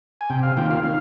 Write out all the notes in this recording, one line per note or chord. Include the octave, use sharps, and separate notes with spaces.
G#5
C3 G5
F5
D#3 A#3 F4 G5
F5
D#3 F5